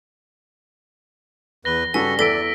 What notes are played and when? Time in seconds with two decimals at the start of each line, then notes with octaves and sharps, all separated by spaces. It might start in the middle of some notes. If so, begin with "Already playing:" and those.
1.65 E2 B4 A#6 G7
1.94 G2 C#3 G3 F#4 A4 G#5 B6
2.19 E2 A4 D5 E6 B6 D7